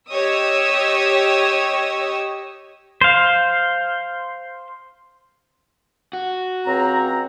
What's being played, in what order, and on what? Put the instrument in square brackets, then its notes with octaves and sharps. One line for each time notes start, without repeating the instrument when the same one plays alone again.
[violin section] G4 C#5 D#5 D#6 E6
[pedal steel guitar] C5 F5
[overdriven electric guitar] F#4
[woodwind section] C#2 C4 A#5